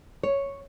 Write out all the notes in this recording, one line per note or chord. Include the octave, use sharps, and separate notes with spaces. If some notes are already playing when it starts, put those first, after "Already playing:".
C#5